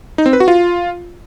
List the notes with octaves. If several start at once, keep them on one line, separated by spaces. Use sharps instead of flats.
D#4
C4
B4
F#4
F4